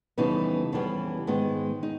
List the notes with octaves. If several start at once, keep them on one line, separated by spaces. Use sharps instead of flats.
F2 C#3 E3 G3 B3 D#4
F2 C#3 E3 G3 B3
G#2 D#3 G#3 B3
D#4